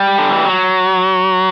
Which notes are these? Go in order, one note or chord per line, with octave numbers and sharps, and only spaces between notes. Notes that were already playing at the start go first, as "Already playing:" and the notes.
Already playing: G3
D3
E3
F#3